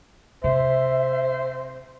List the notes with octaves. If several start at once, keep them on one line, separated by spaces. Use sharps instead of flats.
C3 C5 E5